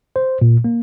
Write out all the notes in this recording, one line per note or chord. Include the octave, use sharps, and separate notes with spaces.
C5
A#2
A#3